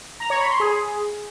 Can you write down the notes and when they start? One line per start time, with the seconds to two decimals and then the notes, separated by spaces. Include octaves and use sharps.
0.20 A#5
0.30 C#5
0.40 B5
0.50 C6
0.60 G#4